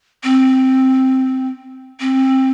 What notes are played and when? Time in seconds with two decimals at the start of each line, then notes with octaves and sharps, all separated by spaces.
0.23 C4
2.00 C4